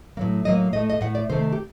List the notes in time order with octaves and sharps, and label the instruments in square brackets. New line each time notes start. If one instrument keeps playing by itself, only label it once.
[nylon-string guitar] A2 F#3 A#3
A2 F#3 A#3 D#5
A2 A3 D#5
D#5
A2 A3 F#5
D5
C3 D#3 A3 C5
G4